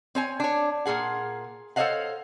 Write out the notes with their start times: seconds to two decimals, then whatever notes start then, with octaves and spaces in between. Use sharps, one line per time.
0.15 C4 C#5 G#5
0.40 D4 C#5
0.86 A#2 F4 G#4 F#5
1.76 A4 C5 C#5 D#5 F5 F#5